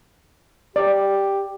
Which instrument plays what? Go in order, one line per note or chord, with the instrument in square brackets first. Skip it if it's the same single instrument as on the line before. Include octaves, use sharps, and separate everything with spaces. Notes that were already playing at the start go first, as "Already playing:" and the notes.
[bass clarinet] G4 [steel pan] D5